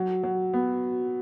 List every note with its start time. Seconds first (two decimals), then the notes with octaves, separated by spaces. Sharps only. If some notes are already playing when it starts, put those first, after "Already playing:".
Already playing: F#3
0.23 F#3
0.54 B3